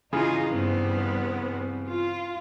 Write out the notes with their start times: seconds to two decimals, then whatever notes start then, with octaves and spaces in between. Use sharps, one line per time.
0.13 C#3 E3 D#4 F4 G#4
0.49 G2 B3 C4
1.88 F4